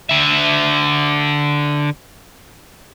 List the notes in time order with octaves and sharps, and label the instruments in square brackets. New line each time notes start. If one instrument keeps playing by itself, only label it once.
[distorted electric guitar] D3 E5